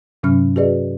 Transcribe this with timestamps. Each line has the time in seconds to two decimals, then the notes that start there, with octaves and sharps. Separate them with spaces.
0.23 G2 C3 F#3 C#4 F6
0.56 F#4 G#4 B4 D5 D#5